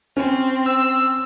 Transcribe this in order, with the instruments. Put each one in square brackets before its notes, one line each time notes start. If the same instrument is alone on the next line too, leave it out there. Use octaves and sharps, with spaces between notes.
[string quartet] C4 [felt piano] C#4
[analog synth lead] E6